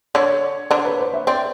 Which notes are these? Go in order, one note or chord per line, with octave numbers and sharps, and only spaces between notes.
D3 D4 C#5
D3 D4 C5
B4
C5
E5
C4 D5